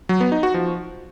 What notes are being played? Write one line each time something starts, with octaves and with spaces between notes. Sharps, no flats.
F#3
B3
D#4
F#4
F3